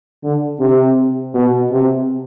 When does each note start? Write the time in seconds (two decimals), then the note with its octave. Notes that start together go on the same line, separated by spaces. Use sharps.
0.23 D3
0.60 C3
1.34 B2
1.71 C3